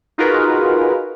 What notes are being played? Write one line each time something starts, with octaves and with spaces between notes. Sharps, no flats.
D#4 F4 F#4 G#4 A#4 B4